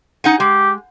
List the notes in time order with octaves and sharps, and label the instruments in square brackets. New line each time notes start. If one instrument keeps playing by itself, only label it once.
[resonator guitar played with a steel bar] D#4 F#5 G#5
[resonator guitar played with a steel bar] G#3 [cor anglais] G4